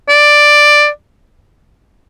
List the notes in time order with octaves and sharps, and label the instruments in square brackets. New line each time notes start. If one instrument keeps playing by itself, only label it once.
[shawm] D5